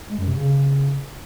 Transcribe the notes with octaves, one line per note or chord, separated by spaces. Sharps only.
G#3
F#2
C3
C#3